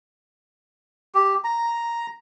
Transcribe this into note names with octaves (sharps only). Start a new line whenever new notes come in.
G4
A#5